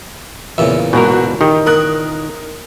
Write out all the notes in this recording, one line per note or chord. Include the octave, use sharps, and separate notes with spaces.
E2 A#2 C#3 E5
G#2 B2 A#3 F#4 A#4
D#3 G4
A#4 D#6 F#6